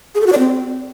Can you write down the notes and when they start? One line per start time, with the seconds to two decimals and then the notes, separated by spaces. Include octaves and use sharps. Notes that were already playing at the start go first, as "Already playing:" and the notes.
0.15 G#4
0.21 A4
0.27 F#4
0.32 D5
0.38 C4